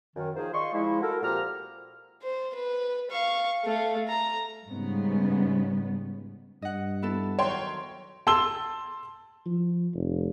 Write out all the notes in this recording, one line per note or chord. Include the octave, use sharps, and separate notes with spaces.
F#2 D#3
D#3 F3 A#3 G#4 C5
F4 D5 D#5 C6 C#6
F3 G#3 E4
F#4 A4 A#4
A#2 F3 C4 G4 A#5 F6
C5
B4
F5 C#6
A3 F5
A#5
G#2 C#3 G3 B3
G2 D#5 F#5
B3 E4 A4
D#3 F#3 C#5 G5 C6
A5 C6 E6 G7
F3
F1